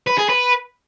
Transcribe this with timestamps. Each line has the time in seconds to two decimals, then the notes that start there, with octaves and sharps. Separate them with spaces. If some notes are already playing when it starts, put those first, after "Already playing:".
0.07 B4
0.18 G#4
0.29 B4